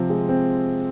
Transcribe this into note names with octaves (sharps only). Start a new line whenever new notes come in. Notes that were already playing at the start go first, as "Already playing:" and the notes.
Already playing: C3 F3 C4
G#3
C4